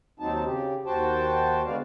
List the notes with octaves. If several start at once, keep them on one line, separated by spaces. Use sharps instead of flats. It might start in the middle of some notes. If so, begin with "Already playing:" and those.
D#2 F#3 C4 D#4 A5
C#3 G4
D#2 F#4 C5 G5 A5
D3 G#3 B3 F#4 D5 F5